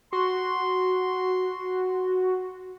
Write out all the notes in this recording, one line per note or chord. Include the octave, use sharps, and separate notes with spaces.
F#4 C6